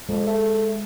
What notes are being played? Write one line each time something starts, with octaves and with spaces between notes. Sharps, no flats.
F2 G#3
A3